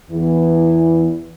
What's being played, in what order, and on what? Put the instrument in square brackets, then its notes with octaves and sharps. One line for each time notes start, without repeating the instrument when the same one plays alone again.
[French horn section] E2 E3